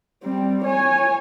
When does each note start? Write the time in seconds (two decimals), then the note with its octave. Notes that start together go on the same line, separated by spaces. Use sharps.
0.23 G3 C4
0.64 C#5 G#5